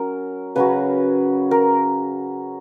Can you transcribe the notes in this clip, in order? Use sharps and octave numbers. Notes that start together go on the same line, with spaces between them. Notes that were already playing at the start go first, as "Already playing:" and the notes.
Already playing: F#3 C#4 A#4
C#3 F#3 C#4 F#4 B4
A#4